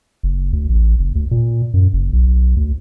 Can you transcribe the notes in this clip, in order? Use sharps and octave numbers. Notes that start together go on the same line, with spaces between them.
F#1
D2
A1
F#1
D2
A#2
F#2
F#1
B1
D2